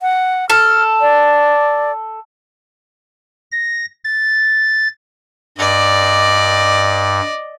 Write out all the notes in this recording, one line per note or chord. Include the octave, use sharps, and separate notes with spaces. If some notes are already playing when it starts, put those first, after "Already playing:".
F#5
A4 F6
D5
A#6
A6
G2 D5 D#5